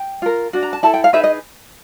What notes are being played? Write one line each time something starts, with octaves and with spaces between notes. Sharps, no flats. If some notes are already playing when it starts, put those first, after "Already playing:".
Already playing: G5
F4 A#4
D4 F#4
A#5
A5
E4 A4 A5
G5
F5
D#4 G#4 B4 E5
D#5